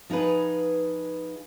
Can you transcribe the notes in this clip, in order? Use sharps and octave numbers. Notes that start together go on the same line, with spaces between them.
F3 D#4 G#4 B4